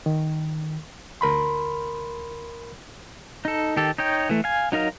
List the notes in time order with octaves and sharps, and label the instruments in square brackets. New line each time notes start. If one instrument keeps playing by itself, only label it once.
[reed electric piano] D#3
D2 A#4 B5 C6
[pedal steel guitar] D#4 A4
D#3 G4 A4
D#4 C#5 G5
E3 A3
F5 G#5
F#3 D#4 A#4 F5